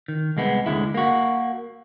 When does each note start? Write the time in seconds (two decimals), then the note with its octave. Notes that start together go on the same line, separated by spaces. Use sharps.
0.08 D#3
0.37 C2 G#3 B3
0.66 D2 G#2 D3 G#3 E4
0.94 A#3 F#4